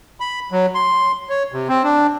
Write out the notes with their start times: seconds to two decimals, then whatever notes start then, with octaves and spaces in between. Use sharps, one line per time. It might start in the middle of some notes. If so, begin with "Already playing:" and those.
0.20 B5
0.52 F#3
0.75 C6
1.29 C#5
1.52 C3
1.68 C4
1.83 D4